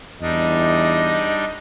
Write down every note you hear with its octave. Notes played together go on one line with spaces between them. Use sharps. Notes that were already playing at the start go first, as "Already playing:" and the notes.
E2 G3 D4 D#4 D#5